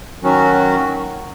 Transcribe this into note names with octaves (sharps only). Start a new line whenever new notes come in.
D#3 F#3 C#4 F#4